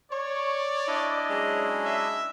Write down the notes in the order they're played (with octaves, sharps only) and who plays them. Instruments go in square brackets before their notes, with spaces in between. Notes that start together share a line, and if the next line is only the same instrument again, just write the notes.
[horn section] C#5 [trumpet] D5
[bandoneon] D4 E4 D#5
[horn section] F#3 G#3 C#4
[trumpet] E5